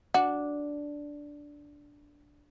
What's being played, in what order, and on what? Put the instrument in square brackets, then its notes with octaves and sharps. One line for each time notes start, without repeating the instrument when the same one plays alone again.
[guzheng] D4 [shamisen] F#4